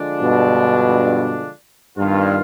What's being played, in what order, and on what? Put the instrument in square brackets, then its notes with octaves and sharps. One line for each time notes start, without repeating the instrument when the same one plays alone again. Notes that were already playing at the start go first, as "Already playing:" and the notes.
Already playing: [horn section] D3 F3 G#3 D4 F4
[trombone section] G2 B2
[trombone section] G2 [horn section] D#3 B3 F4